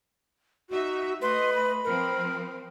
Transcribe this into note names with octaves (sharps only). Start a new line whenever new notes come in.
D#4 F#4 E5
A3 B4 D#5 C6
B5
F3 C4 A#4